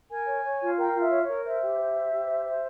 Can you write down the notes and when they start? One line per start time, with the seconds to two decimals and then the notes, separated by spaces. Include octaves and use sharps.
0.09 A#4 G#5
0.27 C#5
0.44 C#5
0.60 F4
0.77 A#4 G5
0.94 F4
0.99 E5
1.11 C#5
1.22 C#5
1.27 A#4
1.44 C5 E5
1.61 G4
1.78 C5
1.95 C5
2.12 G4
2.29 C5
2.45 C5